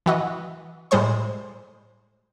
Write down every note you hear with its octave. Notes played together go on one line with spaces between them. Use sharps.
E3 F#4 D#5
A2 G3 G#3 C5 C6